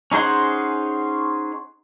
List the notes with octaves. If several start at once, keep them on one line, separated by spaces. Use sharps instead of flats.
C#4 D#4 G#4 C5 F#5